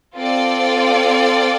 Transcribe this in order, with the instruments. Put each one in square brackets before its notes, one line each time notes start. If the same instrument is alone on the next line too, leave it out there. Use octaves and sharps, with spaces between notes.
[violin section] C4 F4 A4 D5